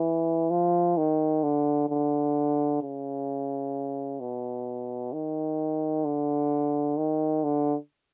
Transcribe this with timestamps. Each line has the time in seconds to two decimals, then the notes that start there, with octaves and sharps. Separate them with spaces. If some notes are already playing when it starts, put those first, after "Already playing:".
Already playing: E3
0.50 F3
0.97 D#3
1.43 D3
1.90 D3
2.82 C#3
4.20 B2
5.13 D#3
6.05 D3
6.97 D#3
7.44 D3